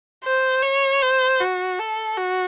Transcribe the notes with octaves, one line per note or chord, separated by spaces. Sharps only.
C5
C#5
C5
F#4
A4
F#4